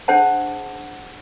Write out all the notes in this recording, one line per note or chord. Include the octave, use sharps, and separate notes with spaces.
D4 G#4 C5 F#5 A5